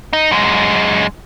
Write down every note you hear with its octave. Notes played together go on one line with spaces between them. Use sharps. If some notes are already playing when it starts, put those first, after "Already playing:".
D#4
F#2 G#3